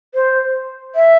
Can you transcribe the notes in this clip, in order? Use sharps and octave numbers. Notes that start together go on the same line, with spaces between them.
C5
E5